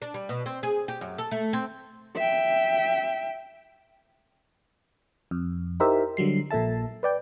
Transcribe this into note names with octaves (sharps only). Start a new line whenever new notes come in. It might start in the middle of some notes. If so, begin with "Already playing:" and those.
D4
G3
B2
C4
G#4
G4
F#2
A4
A3
C4
E5 G5
F2
D#4 E4 G4 A#4 C5 E5
D3 F#3 G3 C7
A#1 A#2 A4 E5 A5
B4 D5 G5